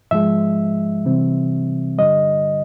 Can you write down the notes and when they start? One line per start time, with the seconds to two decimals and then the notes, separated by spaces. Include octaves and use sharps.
0.11 G#2 F3 G#3 E5
1.05 C3 E3 G3 C4
1.98 G2 D3 G3 D#5